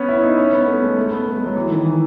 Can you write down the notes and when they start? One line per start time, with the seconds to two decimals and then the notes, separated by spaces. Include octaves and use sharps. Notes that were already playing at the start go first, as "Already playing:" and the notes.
Already playing: B3 C#4
0.09 E4
0.23 D#4
0.38 C#4
0.53 B3
0.67 A3
0.82 G#3
0.97 A3
1.11 B3
1.27 A3
1.36 G#3
1.46 F#3
1.56 E3
1.70 D#3
1.85 E3